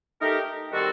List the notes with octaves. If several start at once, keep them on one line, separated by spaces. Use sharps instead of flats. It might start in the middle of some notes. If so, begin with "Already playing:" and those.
A3 D#4 G4 A#4
D#3 G3 C4 F#4 A4